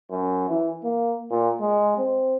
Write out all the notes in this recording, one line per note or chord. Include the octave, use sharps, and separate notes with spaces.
F#2
E3
A#3
A#2
G#3
C4